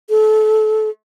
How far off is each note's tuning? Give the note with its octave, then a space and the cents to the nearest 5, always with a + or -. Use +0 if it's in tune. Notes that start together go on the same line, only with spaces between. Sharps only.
A4 -30